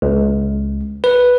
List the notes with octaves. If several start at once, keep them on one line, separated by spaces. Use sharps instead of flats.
C#2
B4